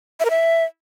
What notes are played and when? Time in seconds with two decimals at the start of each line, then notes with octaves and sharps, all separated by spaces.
0.20 E5
0.25 A#4
0.30 E5